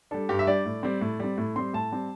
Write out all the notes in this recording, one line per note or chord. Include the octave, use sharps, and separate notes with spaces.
G3 D4 A4
G2 G4
E5
G3 D4 D5
A2
G3 C4
A2
G3 C4
A2
G3 C4 C6
A2 A5
G3 C4